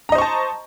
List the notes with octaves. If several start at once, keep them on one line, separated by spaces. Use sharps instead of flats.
C5 D#5 A5 A#5 C#6